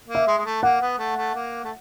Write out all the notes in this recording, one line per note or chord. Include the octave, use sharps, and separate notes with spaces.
A#3
E5
G#3
G#3
A3
A#3 F#5
B3
A3
A3
A#3
A3